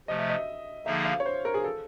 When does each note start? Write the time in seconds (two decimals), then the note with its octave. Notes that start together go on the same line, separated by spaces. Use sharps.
0.08 C3 F3 A3 D#5
0.19 E5
0.29 D#5
0.86 D3 F3 A#3 D#4 G#4 E5
1.05 F5
1.20 C#5
1.26 C5
1.45 A#4
1.54 G#4
1.64 A4